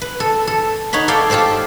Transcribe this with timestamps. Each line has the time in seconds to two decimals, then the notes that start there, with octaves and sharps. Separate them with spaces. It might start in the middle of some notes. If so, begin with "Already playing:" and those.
0.02 B4
0.20 A4
0.47 A4
0.93 D#4 C#5 F#5 B5
1.08 A4 D5 F5 G5
1.30 F4 G4 A4 C5 D5